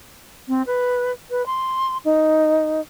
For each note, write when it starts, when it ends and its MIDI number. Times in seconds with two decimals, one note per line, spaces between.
0.48 0.62 60
0.66 1.11 71
1.30 1.45 71
1.46 1.97 84
2.05 2.80 63